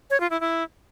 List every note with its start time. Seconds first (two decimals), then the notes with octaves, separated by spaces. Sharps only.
0.10 C#5
0.20 F4
0.30 E4
0.41 E4